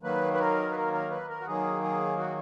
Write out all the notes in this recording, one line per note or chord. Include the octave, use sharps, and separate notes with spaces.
D#3 F#3 A#3 B4
B4
A#4
B4
A#4
A#4
B4
A#4
F#4
D#3 F#3 A#3 G#4
G#4
F#4